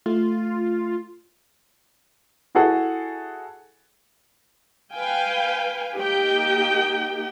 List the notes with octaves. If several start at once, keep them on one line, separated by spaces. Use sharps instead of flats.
A3 F4
E4 F#4 G#4 A4 F#5
B4 F5 G5 G#5
A#3 D#4 G4 G5